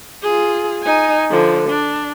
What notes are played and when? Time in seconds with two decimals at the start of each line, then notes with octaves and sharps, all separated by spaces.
0.23 F4 G#4
0.83 D#4 G#5
1.30 D3 F3
1.69 D4